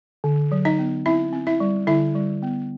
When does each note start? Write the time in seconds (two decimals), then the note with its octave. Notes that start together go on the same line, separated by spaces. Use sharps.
0.24 D3
0.52 F#3
0.65 D#4 D#5
0.79 B3
1.06 C4 E4 E5
1.33 C4
1.47 E4 E5
1.60 G3
1.87 D3 E4 E5
2.15 G3
2.43 B3